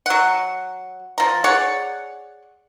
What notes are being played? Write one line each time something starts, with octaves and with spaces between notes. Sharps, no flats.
F#3 F#5
F3 A#5
G#4 C#5 D5 F#5